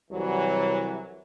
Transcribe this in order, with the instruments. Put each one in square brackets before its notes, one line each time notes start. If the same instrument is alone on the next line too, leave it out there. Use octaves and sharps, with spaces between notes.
[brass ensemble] C2 E3 F#3